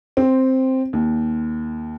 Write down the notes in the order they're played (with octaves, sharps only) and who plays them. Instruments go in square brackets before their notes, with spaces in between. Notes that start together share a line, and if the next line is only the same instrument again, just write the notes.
[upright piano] C4
D#2